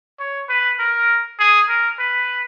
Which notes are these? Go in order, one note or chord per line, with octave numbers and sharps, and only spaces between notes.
C#5
B4
A#4
G#4
A#4
B4